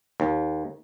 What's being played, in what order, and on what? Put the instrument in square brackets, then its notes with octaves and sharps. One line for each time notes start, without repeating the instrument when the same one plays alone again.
[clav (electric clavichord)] D#2